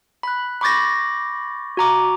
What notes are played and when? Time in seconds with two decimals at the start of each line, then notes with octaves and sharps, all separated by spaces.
0.23 B5 F#6
0.61 B5 C#6 D6 G6 A6 A#6
1.77 F#4 A#5 D6